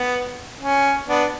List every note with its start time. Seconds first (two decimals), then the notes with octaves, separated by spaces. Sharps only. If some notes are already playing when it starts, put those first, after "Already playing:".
Already playing: B3
0.60 C#4
1.08 B3 D4